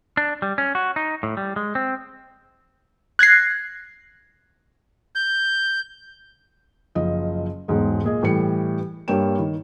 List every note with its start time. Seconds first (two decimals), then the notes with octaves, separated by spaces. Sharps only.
0.17 D4
0.42 G3
0.58 C#4
0.75 F#4
0.96 D#4
1.23 A2
1.37 G3
1.56 G#3
1.75 C4
3.19 F#6 G#6 A#6 C7
5.15 G6
6.95 F#1 F3 D#5
7.68 E1 B1 G#2 G#3
8.04 A#2 G#4 D#5
8.23 A2 E3 G3 C#7
9.08 G2 G3 A#3 C#5 G5 E7
9.39 D#3